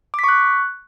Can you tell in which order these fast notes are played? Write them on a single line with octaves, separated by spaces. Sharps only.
D6 B6 C#6 F#6